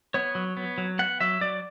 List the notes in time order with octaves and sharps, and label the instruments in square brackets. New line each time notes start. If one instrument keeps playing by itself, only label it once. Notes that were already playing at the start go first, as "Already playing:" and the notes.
[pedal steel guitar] B3 C#5
F#3
B3
F#3
B3 F#5
F#3 E5
F#3 D5